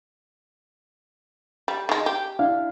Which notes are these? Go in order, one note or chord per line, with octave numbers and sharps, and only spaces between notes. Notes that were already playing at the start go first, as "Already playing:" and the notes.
G3
D#3 G#3
G4
D4 E4 F5